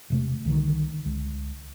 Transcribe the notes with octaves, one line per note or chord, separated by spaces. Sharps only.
E1 C3 A3
C2 D3 D#3
C#2